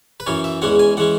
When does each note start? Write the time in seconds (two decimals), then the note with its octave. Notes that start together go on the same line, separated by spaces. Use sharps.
0.20 B4
0.26 F#2 E3 C#4 C#5
0.44 E5
0.62 E2 E3 G#3 C#4 F#5
0.79 G#5
0.97 E3 G#3 C#4 F#5